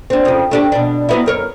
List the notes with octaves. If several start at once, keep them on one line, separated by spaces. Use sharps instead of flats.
C4 D4
F2 C#3
A3 D4 G4
B2 D4
F#3 B3 E4
F#2 A#4 C#5